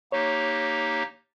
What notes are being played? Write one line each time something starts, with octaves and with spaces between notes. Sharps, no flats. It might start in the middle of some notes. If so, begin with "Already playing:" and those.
A#3 D#4 G4 C#5